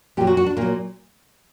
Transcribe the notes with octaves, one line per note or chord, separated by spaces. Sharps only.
A#2 F#3 G4
F#4
F#4
D4
A#2 F#3 A#3